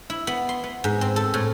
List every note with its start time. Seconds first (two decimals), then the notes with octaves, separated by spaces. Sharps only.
0.10 E4
0.27 B3
0.49 C6
0.64 B3
0.84 G#2
1.01 C4
1.16 A4
1.34 A2